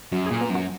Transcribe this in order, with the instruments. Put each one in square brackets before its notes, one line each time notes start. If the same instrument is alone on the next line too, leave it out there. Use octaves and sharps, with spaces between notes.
[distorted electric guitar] F#2 [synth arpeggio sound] F#4
[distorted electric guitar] A#2 [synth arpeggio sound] G#4
[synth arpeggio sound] B3
[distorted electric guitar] F#2
[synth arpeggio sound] F#3